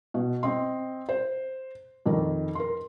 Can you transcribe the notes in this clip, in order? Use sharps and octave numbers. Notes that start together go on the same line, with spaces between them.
B2
C4 D#5 C6
C5
F2 D#3 A#4
A#4 C6